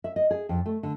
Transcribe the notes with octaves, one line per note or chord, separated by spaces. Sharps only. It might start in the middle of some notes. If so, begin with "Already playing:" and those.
E5
D#5
G#4
F2
A3
D3